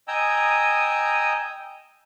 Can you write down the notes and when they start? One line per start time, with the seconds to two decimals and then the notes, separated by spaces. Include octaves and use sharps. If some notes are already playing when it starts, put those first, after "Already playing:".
0.08 D#5 G5 G#5 A#5 D#6 E6